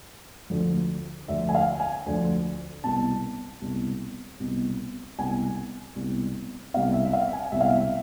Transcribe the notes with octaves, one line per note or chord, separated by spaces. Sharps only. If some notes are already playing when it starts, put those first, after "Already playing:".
D2 D3 F3
D2 D3 F3 E5
G#5
F5
G#5
D2 D3 F3
C2 B2 A5
C2 B2
C2 B2
C2 B2 G#5
C2 B2
C2 B2 F5
E5
E5
F5
G#5
C2 B2 E5
F5
E5